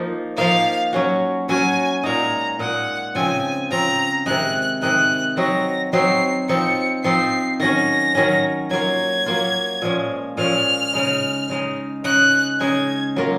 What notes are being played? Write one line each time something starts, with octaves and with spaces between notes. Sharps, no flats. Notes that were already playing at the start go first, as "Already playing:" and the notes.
Already playing: F3 A#3 D#4
F3 A#3 D#4 F5
F#3 C#4 F#4
F#3 C#4 F#4 G#5
A#2 G#3 D#4 A#5
A#2 G#3 D#4 F#5
C#3 F3 C4 F4 G#5
C#3 F3 C4 F4 A#5
C3 D#3 G#3 D#4 F#6
C3 D#3 G#3 D#4 F#6
F#3 C4 D#4 F#4 A#6
F#3 C4 D#4 F#4 C7
F3 C4 D#4 C#7
F3 C4 D#4 C7
D#3 F#3 C#4 A#6
D#3 F#3 C#4
F#3 A#3 F4 G#6
F#3 A#3 F4
A#2 F3 G#3 C#4
A#2 F3 G#3 C#4 F6
C#3 G#3 D#4
C#3 G#3 D#4
C#3 G#3 D#4 F#6
C#3 G#3 D#4 G#6
F#3 A#3 F4 A#4